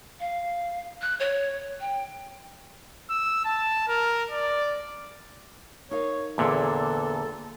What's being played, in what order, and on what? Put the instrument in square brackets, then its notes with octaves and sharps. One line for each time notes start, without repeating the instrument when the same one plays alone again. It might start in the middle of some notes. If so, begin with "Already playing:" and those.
[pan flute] F5
F#6
C#5
G5
[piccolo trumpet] E6
A5
A#4
D5
[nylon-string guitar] D#4 A#4 F5 [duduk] C#5
[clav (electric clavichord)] E2 A#2 D3 [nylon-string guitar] A#3 G#4 C#5 [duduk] A4